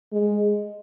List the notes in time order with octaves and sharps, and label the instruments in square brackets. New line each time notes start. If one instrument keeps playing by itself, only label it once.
[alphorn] G#3